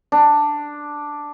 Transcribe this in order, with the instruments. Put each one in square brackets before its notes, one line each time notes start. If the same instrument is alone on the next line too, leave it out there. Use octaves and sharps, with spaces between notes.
[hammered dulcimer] D4